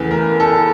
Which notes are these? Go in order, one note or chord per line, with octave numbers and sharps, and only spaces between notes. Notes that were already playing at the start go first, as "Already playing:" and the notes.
Already playing: E2 C#3 E3 A3 B4
A#4
A4